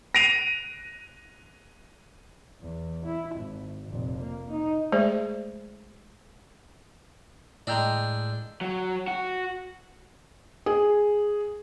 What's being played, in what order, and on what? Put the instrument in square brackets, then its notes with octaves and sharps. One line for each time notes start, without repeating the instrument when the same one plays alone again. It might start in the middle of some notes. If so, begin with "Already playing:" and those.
[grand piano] A#6 C7 D7 D#7 F7
[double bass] E2
E4
G#1
F1 A#2
A#3
D#4
[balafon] G#3 A3 G#4 C5 D5
[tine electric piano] A2 E6 G6 [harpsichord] G#3 D4 [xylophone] D#5 G5 A#5
[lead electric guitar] F#3
F#4
[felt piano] G#4